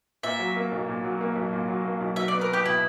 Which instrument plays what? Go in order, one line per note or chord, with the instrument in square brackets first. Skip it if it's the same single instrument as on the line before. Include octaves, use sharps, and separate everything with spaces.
[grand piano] A#2 [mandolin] E5
[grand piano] F#3
A#3
B1
A#2
F#3
A#3
B1
A#2
F#3
A#3
B1
[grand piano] F#3 [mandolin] E5
[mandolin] D5
[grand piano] B3
[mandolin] A#4
[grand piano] B2
[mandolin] G4
[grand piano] B2 [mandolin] E4